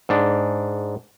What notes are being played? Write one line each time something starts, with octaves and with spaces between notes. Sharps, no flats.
G#2 D4